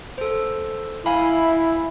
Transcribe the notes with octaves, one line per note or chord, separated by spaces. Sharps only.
A4 C5
E4 F5 G#5 B5